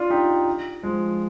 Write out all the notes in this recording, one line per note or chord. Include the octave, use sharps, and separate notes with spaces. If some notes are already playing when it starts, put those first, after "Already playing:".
Already playing: D4 F4
D#4 G4
F3 G#3